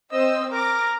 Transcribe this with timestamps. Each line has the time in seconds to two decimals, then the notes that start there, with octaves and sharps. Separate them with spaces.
0.12 C4 C5 D#5 E6
0.52 A#4 D6 A#6